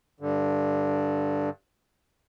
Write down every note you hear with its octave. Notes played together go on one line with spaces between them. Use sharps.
G2 D3